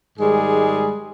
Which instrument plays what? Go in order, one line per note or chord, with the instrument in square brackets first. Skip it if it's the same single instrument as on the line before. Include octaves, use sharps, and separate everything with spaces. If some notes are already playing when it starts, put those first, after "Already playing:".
[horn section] G#2 D#3 G3 G#3 G#4